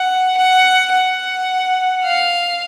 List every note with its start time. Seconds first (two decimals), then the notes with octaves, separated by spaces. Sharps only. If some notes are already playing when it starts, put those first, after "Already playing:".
Already playing: F#5
0.37 F#5
0.92 F#5
2.04 F5